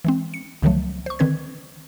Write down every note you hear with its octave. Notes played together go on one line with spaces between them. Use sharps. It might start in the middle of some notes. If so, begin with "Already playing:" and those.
E3 G#3 C4
C#7
C#2 D3 D#3 F3 F#3 A3
C5 C#6
D3 D#3 C4 B4 G#6